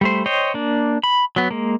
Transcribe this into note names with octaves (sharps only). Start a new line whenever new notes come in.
G3 A3 C5
C5 C#5 D#5 G5
A#3 D4
B5
F#3 B3
G#3 A#3